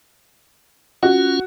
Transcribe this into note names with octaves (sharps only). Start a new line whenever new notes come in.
C#4 F4 F#4